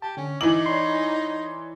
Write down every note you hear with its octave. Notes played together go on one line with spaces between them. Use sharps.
G4 A5
D3 C#4
E3 D#4 A#5 D6 F#7
C#5 D5 B5 C6